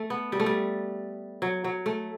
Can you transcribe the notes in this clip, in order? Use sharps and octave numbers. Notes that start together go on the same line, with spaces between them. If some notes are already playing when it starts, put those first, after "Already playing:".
Already playing: A3
B3
G3
A3
G3
F#3
F#3
A3